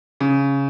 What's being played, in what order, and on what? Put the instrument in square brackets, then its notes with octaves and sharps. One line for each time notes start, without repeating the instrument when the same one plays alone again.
[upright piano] C#3